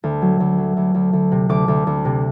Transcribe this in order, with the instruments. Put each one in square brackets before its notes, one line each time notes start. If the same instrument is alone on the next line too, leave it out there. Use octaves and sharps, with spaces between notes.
[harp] D2
F#3
D2
F#3
D2
D2
D2
C3
D2 D6
D2
D2
C3